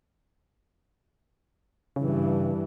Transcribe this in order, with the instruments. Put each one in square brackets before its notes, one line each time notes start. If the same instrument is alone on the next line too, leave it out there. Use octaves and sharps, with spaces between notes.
[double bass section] G2 E3 [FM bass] C#3